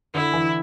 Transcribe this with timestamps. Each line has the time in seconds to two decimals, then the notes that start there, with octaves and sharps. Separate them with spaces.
0.14 D3 E4
0.33 E3